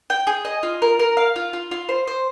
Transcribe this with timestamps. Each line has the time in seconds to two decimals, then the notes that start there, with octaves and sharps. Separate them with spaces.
0.10 G5
0.27 G#4
0.45 D#5
0.63 F4
0.82 A#4
0.99 A#4
1.17 F5
1.36 F4
1.53 F4
1.71 F4
1.89 C5
2.07 C5